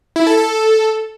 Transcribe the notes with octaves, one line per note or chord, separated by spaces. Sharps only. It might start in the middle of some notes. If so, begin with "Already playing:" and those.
E4
A4
A4